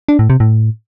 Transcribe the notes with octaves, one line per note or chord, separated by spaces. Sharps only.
D4
A2
C3
A2